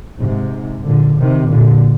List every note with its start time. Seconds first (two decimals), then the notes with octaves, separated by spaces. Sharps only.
0.20 G#2 C3
0.86 A#2 D3
1.18 C3 D#3
1.50 A#2 D3